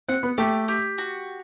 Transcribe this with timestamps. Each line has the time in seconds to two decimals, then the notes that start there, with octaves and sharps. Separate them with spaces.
0.08 C4 F#5
0.23 B3
0.38 A3 G4
0.68 G4
0.98 F#4